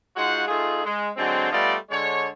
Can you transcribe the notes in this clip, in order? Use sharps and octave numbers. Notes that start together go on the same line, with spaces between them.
G#3 D#4 F4 F#4 C5 F#5
A3 D#4 F4 G#4
G#3
D3 F#3 G#3 C4
G3 A3 B3 F4 D5 D#5
D3 G#3 C#5